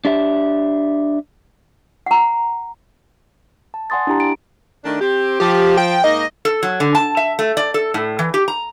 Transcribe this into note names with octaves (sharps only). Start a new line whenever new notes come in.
D4 G4 E5
F#5 A#5
A5
D5 F#5 G#5 C6 D#6 A6
D4 E4 G4 A#5
D7
D#3 A3 D4
C4 G4
F3 G4
G5
G#2 A#3 D#4 D#5
A4
F#3
D3
A5
E5
A3
D5
A4
A2
E3
G4
A#5